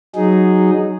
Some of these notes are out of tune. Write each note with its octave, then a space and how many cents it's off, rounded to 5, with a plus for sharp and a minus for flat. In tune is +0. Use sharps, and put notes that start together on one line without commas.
F#3 +0 D#4 -10 G#4 +0